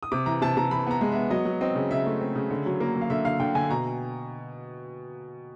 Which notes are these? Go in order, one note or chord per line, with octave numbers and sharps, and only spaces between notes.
D#6
C3 D6
E3 A#5
C3 A5
C3 A#5
E3 B5
B3 A#5
G#3
B3 E5
F#3 D#5
F#3
C4 D#5
C#3
C#3 E5
A3
C4
C#3
D3
F#3
A#3
F#3
F5
D3 E5
D3 F5
D3 G5
D3 G#5
B2 A#5